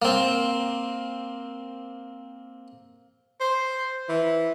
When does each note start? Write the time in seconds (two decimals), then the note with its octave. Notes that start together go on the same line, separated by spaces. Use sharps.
0.02 A#3 C4
3.40 C5
4.09 E3